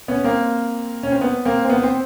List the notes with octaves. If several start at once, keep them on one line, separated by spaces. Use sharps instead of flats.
B3 C#4
A#3 C4
C#4
C4
B3
A#3 C4
C4
B3
C4